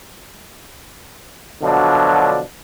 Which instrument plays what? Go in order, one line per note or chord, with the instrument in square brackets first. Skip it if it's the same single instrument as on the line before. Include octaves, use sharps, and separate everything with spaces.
[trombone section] B2 D3 F3 F#3 D4